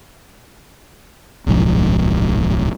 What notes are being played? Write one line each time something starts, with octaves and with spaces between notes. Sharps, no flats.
D1 B1 G#2 F3